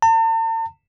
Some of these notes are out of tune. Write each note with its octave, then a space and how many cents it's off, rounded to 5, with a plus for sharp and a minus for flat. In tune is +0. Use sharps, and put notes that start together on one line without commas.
A5 +45